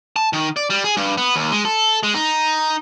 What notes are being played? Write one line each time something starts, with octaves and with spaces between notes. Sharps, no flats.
A5
D#3
D5
G3
G#4
G2
B3
D#2
G#3
A4
G#3
D#4